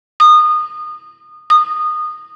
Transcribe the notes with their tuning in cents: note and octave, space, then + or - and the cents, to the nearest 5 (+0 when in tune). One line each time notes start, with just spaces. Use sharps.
D#6 -25
D#6 -20